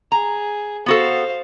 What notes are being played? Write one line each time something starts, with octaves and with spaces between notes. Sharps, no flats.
G#4 A#5
B3 F#4 A4 C5 F5